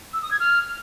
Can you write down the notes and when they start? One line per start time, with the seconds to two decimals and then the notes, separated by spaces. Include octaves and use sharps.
0.13 E6
0.22 D#6
0.31 G#6
0.40 F6